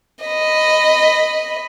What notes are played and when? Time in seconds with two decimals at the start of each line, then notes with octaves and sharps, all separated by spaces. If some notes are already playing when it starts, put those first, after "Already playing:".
0.25 D#5 B5